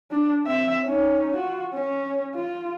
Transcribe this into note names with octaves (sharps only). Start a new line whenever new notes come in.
D4
C4 E5
C#4 D#4
F4 F#4
C#4
F4